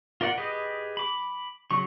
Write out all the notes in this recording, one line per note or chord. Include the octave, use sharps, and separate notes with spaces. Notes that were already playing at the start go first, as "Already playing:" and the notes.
F4 A#4 D5 F#5
G4 G#4 B4 D#5
B5 D6
C#3 F#3 C#6